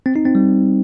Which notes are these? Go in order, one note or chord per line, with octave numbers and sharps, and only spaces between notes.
C4
D#4
C4
G3